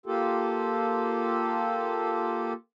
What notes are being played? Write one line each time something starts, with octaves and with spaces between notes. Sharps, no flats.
A#3 F4 G4 A4